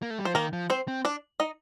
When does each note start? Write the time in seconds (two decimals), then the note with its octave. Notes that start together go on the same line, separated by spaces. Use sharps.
0.02 A#3
0.10 A3
0.18 G3
0.25 F3 C5
0.35 D#3 A#3 A#4
0.53 F3
0.70 C4 C5
0.88 C4
1.05 D4 D5
1.40 D#4 D#5